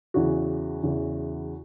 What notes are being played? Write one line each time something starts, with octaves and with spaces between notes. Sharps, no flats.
E2 C#3 E3 F#4
E2 C#3 E3